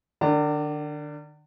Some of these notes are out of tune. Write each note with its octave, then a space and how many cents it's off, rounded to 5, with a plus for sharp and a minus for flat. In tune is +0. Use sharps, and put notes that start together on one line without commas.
D#3 -45 D4 +0 A#5 -40